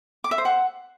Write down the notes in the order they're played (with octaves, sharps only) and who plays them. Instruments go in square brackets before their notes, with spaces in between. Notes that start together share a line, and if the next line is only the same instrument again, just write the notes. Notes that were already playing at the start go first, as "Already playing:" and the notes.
[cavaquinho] D6
E5
C5
F#5